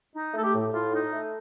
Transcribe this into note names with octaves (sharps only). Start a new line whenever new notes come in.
D#4
A3 A4
G4
A2
A2 F4
D#4
A3